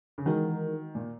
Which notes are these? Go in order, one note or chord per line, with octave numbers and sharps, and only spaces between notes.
C#3
D#3 E3 G#3 D#4 F#4 A#4
A#2